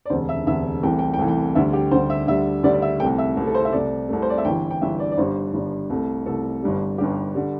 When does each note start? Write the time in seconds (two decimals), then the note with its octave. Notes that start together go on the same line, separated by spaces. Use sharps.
0.06 D5
0.10 E1 D2 C3 C5
0.29 E5
0.47 E1 D2 C3 E5
0.83 C2 C3 E3 A3 G5
0.99 G5
1.14 G5
1.19 C2 C3 E3 A3
1.28 G5
1.55 D2 D3 G3 E5
1.73 G4
1.91 D2 D3 G3 C5
2.10 E5
2.27 D2 D3 G3 E5
2.63 D2 D3 G3 D5
2.74 D5
2.82 E5
3.00 C2 C3 A3 G5
3.18 E5
3.37 C2 C3 A3
3.47 A4
3.55 C5
3.65 E5
3.72 C2 C3 A3 D5
4.09 C2 C3 A3
4.22 C5
4.30 D5
4.38 E5
4.45 G1 G2 E3 G5
4.71 G5
4.82 G1 G2 E3 E5
5.00 D5
5.12 D5
5.17 G1 G2 G3 C5
5.53 G1 G2 G3
5.90 C2 C3 A3
6.26 C2 C3 A3 A4
6.62 G1 G2 G3
6.98 G1 G2 G3 G4
7.35 D3 G3